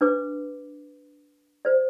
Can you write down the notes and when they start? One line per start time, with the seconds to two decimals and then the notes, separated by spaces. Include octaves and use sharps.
0.01 D4 B4 D6
1.65 C5 D5